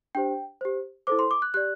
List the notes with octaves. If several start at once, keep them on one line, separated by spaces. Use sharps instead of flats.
D4 G4 C5 G5
G4 C5
E4 A4 C5 D6
C6
D6
F#6
G4 D5 F#6